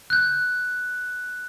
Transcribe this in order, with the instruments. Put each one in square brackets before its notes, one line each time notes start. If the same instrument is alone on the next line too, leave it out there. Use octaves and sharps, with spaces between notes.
[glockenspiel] F#6 G6